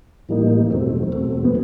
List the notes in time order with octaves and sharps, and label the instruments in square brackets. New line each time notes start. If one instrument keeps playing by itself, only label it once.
[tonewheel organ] A2 E3 G3 A#3 D#4
E2 B2 F#3 A3 C4
E2 B2 F#3 A3 C4
[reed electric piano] B3